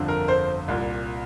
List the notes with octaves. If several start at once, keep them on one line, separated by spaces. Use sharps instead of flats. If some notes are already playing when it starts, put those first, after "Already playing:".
Already playing: G1 F2 D3
A#4
C5
C2 A#2